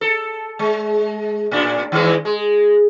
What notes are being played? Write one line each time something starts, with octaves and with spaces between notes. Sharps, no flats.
A4
G#3
A2 D4
D#3 E3 G#3
G#3